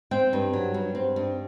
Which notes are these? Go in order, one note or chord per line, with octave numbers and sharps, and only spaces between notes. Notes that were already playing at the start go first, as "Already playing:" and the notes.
C4 G5
G2
F#3
G2
C4
G2